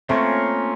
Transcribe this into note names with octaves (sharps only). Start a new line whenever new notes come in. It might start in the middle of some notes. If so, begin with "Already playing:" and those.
A3 A#3 C4 C#4 F4 A#4 C#5